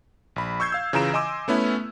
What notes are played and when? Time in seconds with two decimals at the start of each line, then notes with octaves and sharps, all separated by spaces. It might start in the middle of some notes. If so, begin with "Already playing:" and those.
0.36 A#1 B5
0.60 C#6 E6 G6 G#6 C7
0.72 F5 E6
0.93 C#3 E3 F4 A#5 D7 E7
1.14 D#5 G#5 C6 D6 E6
1.48 A3 B3 C#4 E4